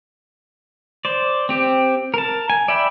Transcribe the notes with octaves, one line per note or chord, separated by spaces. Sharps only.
C5 D5
C4 G4
A#4 A5
G#5
D5 E5 G5 B5